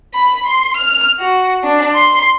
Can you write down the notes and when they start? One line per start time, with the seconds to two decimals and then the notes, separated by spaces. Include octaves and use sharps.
0.14 B5
0.47 C6
0.77 F6
1.20 F#4
1.64 D4
1.95 C6